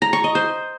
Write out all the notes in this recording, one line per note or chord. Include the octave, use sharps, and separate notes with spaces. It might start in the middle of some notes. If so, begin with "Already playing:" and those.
A#5
C#6
D#5
C5